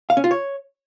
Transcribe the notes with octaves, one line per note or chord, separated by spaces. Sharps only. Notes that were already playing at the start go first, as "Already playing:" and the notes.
F5
C#4
F4
C#5